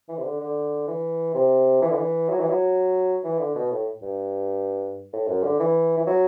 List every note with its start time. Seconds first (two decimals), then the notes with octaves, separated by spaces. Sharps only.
0.09 E3
0.18 C3
0.25 D3
0.41 D3
0.88 E3
1.35 C3
1.82 E3
1.90 D3
1.97 E3
2.29 F#3
2.40 E3
2.49 F#3
3.24 E3
3.39 D3
3.55 B2
3.71 A2
4.02 G2
5.13 A2
5.28 F#2
5.44 D3
5.60 E3
5.97 E3
6.07 F#3